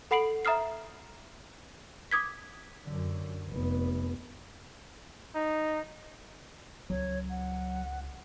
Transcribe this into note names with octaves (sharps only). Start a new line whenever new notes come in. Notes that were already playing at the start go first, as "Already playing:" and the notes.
A4 F#5 B5 C7 D7 F#7
E5 A#5 D#6 F6 C7
D6 D#6 G#6 B6
F#2 D3
F1 B3
D#4
C#2 F#3 C#5
F#5